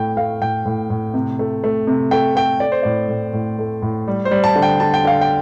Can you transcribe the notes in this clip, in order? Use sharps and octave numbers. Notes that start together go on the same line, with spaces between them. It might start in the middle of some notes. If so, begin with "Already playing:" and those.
Already playing: A2 A3 G5
A3 F5
A2 G5
A2
A2
C3
A3
A3
C3
A3 G5
A3 G5
A3 D5
C5
A2 D5
A2
A2
A3
A2
G3
C5
G3
A5
D3
G5
D3 A5
G5
D3 F5
G5